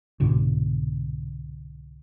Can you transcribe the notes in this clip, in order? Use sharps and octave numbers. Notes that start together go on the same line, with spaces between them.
C2 G#2 B2 D3